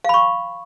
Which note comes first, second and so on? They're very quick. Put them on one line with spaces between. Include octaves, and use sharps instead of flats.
F5 B5 C#6